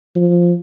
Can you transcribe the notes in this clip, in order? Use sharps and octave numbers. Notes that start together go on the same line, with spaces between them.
F3